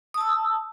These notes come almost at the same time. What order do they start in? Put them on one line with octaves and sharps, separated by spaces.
D#6 A5 E6